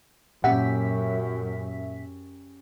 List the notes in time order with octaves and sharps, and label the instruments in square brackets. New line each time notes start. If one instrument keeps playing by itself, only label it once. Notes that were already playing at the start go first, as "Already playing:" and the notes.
[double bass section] F#2 [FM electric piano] A#2 E5 B6 [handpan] C#4 G4 [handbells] F#5